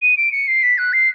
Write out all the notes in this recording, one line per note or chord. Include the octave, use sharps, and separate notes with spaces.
D#7
D7
C#7
C7
B6
F#6
C7